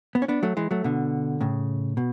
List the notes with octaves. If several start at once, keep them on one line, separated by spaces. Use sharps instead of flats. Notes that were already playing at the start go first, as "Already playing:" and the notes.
B3
C#4
B3 D4
F#3 A3
E3 G#3
F#3 A3
B2 D3
A2 C#3
B2